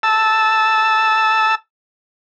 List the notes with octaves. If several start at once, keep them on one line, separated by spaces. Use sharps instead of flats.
A5 E6